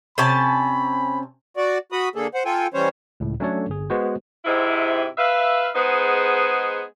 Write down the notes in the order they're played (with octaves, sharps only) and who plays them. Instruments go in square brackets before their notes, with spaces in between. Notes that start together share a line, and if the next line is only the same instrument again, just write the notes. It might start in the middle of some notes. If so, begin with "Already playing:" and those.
[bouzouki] C3 C#4 A5 [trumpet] B5
[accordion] F#4 D5
F#4 B5 D#6
D3 A#3 G#4 A4
C5 F#5
F4 A4 G5 G#5
E3 G3 C#4 C5 C#5
[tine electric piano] C#2 A2
F#3 A3 C#4 D4 A4 C#5
G1 G#4
G#3 B3 F#4 B4 C5
[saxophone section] G#2 C3 E4
B4 E5 F5
G#3 B3 D#4 G#4 C5 F#5